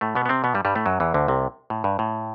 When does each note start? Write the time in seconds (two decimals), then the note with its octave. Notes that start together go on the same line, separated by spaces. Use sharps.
0.01 A2 A3
0.15 B2 B3
0.26 B3
0.29 C3 C4
0.44 B2 B3
0.54 G2 G3
0.65 G2 G3
0.75 A2 A3
0.86 F#2 F#3
1.00 E2 E3
1.14 D2 D3
1.28 C2 C3
1.70 A2
1.84 G2
1.99 A2